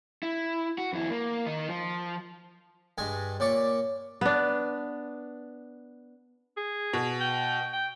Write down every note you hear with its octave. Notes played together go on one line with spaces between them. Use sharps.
E4
F#4
F2 E4
A#3
D#3 D#4
F3
G2 G#3 G#5
A#2 C#5 D5 C#6
B3 D4
G#4
B2
G5
G5